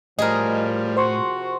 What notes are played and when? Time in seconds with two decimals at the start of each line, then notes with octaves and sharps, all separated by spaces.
0.19 A2 F3 G3 G#4 A#4 D#5
0.97 C3 F3 F#4 C5 C6 C#6